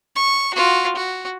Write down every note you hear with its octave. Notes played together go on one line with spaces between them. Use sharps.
C#6
F4 F#4
F#4